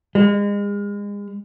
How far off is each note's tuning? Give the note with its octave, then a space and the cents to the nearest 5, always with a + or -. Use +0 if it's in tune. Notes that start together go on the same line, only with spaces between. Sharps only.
G#3 -35